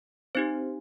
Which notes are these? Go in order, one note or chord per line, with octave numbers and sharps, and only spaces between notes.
C4 D#4 G4 C5